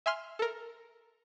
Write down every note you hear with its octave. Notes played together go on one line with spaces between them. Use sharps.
E5 G#5 C6 F6
A4 A#4